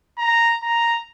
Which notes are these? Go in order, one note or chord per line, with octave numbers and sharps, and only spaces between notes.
A#5
A#5